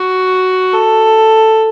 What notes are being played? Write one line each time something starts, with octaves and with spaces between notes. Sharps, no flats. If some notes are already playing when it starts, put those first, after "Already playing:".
Already playing: F#4
A4